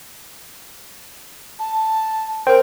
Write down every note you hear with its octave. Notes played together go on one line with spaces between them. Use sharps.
A5
A#4 C5 G5